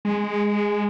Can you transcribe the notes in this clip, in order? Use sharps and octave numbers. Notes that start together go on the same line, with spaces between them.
G#3